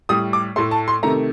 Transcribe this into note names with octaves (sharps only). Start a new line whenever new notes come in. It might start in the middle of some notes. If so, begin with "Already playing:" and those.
A2 G3 D#6
D6
A2 A3 C6
A5
C6
C3 D#3 A3 A#5